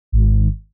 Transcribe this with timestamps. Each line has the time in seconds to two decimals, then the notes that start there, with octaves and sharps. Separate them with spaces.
0.12 G#1